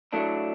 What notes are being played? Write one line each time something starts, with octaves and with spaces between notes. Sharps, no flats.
A2 F#3 A3 D4